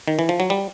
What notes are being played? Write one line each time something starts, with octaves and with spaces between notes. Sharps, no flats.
D#3
E3
F3
F#3
G3